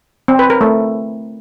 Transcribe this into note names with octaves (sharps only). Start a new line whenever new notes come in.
C4
B4
A#4
A3